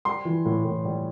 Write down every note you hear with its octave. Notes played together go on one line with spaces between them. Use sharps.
G3 C6
E3
A2
A2
G3